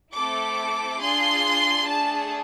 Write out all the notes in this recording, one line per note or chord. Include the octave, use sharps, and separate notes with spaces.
A3 C4 E4 A4 D6
D4 F4 G#4 C6
A3 D4 G#4 A5